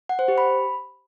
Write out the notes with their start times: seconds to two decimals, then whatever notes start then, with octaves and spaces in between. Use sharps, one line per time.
0.09 F#5
0.19 C5
0.28 G4
0.38 B5